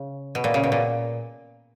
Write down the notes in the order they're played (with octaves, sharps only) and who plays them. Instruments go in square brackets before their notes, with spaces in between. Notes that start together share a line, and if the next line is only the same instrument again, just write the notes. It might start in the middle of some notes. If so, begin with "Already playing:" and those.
Already playing: [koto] C#3
B2
A#2
C#3
B2
A#2